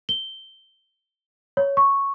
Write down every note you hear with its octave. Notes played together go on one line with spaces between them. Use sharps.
G7
C#5
C#6